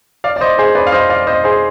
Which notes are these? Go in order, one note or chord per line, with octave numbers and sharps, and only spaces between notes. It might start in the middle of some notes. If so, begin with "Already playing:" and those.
D5 F5
D5
C5 D#5
G#4 C5
B4 D5
F5
C5 D#5
D5 F5
C5 D#5
G#4 C5